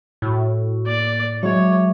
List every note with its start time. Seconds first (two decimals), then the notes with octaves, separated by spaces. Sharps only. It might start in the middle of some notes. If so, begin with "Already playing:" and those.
0.22 A2 E4 F#4 C#6
0.87 A#3 D5
1.43 F#3 G#3 C#5 E5 D6